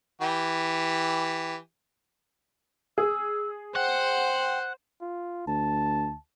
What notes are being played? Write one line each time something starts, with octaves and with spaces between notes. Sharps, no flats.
E3 G4
G#4 E6
C5 F#5 G5
F4
D2 A5